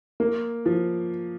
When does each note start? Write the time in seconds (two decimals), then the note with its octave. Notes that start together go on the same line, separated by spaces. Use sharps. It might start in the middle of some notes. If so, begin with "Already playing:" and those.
0.20 A#3
0.66 F3